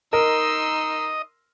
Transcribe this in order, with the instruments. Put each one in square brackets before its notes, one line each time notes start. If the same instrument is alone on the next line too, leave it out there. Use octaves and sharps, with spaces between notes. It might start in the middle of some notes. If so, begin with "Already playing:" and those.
[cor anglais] D#4 [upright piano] A#4 [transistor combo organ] D#5 [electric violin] C6 E6